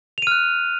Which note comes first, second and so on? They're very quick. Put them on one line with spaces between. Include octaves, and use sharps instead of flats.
F7 D#7 F6 F#6